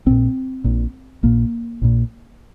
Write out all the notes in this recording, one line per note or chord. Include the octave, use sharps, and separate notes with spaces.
A#1 A#2 C4
A#1 A#2
A#1 A#2 A#3
A#1 A#2